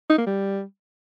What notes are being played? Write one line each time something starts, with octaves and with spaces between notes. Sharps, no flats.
D#4
A#3
G3